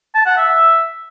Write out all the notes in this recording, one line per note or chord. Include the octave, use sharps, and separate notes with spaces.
A5
F#5
E5